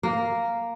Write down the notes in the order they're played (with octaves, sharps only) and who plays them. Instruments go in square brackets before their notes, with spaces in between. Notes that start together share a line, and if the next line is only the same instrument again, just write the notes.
[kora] A#3